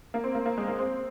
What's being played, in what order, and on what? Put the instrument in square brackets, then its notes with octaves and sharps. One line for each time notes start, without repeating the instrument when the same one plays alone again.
[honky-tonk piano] A#3
C4
A#3
A#3
G#3
A#3
C4